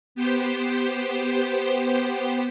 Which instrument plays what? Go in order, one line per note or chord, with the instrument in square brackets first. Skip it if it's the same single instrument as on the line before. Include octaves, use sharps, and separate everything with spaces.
[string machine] B3 G4 C5